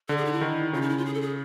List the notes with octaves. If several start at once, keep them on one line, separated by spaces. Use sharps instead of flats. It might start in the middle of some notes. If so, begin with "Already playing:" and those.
D3 A4
G#4
D#4
E4
D#3
C#3 F4
D#4
E4
F4
G#4
A4
G#4